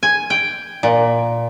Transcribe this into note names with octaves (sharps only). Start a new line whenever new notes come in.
G#5
G5
A#2